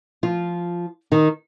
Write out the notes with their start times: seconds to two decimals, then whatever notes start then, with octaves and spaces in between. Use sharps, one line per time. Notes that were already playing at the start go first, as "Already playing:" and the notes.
0.23 F3 F4
1.11 D#3 D#4